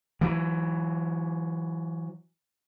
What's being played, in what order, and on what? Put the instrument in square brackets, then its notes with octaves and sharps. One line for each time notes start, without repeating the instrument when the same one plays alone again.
[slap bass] E3 F#3